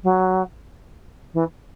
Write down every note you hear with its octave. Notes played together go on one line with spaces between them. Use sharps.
F#3
E3